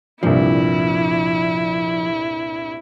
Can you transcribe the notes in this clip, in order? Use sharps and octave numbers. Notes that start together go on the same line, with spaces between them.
C2 G2 A#2 F3 E4